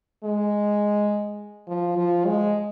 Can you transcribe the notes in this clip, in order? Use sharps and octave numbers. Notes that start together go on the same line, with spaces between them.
G#3
F3
F3
G#3